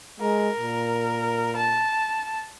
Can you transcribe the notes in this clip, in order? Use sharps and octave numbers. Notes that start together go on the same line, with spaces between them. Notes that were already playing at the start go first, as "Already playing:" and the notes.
G#3 A#4
A#2
A5